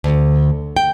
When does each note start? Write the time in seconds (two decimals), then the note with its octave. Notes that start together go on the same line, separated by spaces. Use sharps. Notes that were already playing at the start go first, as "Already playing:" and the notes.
0.04 D2
0.77 G5